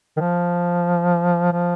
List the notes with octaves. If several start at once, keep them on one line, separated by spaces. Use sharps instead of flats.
D#3
F3
F3